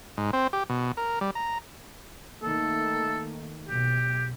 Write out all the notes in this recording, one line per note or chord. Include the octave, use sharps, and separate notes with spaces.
G#2
C4
G4
B2
A#4
G3
A#5
D#3 A3 A#3 A4
B1 G4